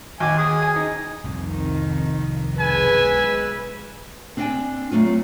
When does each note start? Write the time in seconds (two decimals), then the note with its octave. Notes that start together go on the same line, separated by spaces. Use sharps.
0.20 D#2 F#4 G#5 D6
0.38 G#4
0.62 G#5
0.76 D#4
1.24 F1 C2 F2 D#3 C4
2.59 B1 G#3 B4 G#5 E6
4.37 C4 D4 D5 D#5 G5 G#5
4.91 F#3 A3 C4 F4